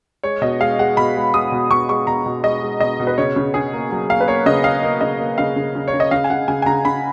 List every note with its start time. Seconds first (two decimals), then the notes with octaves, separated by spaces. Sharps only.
0.23 G#3 C#5
0.41 B2 D#5
0.60 G#3 F5
0.79 G#3 F#5
0.97 B2 B5
1.16 G#3
1.34 G#3 D#6
1.52 B2
1.70 B2 C#6
1.89 G#3 C#6
2.07 B2 A#5
2.26 B2
2.44 G#3 D#5
2.62 G#3
2.80 B2 D#5
3.00 B2
3.07 B4
3.18 C#3 C#5
3.36 C#3
3.54 C#3 G#4
3.73 A#3
3.91 F#3
4.09 A#3 F5
4.21 B4
4.27 A#3 C#5
4.46 C#3 D#5
4.64 A#3 F5
4.83 A#3
5.01 C#3 D#5
5.20 A#3
5.38 C#3 F5
5.56 C#3
5.75 C#3
5.88 C#5
5.93 C#3
6.00 D#5
6.11 C#3 F5
6.24 G#5
6.30 C#3 F#5
6.48 C#3 G#5
6.62 G#5
6.66 C#3 A#5
6.85 C#3 B5